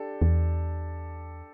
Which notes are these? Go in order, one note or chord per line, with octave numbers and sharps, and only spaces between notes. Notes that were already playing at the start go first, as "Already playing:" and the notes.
Already playing: D4 G4 A4
E2